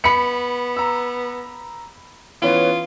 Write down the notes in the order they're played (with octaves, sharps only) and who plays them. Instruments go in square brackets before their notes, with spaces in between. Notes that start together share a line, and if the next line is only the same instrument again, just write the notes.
[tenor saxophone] B3 [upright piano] B5 B6 C#7
[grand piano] A#5 E6
[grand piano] E3 B3 C#4 [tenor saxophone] F4